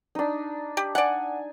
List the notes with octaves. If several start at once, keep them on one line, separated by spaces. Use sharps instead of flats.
D4 D#4
G4
D5 F#5 G#5